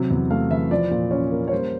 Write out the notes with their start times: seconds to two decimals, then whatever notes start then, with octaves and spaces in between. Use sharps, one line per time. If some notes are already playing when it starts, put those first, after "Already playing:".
Already playing: C3 F#3
0.11 E2
0.30 A3 F5
0.51 E3 E5
0.71 F3 D5
0.91 A#2
1.11 C#4 C#5
1.32 A#3
1.48 C#5
1.52 G3 C5